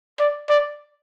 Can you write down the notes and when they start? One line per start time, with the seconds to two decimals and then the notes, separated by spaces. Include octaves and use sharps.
0.19 D5
0.49 D5